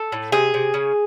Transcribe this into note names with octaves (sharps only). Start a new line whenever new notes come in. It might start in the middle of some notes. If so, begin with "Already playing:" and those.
Already playing: A4
A2
C3 G#4
C3
C#3